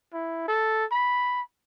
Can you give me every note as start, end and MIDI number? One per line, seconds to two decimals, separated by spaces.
0.13 0.46 64
0.48 0.85 69
0.91 1.41 83